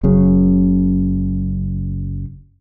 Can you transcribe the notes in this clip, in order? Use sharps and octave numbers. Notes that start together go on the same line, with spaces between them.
F#1 F#2 C#3